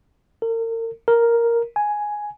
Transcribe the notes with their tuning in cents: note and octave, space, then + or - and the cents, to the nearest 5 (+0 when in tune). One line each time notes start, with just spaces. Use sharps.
A#4 -40
A#4 +0
G#5 +5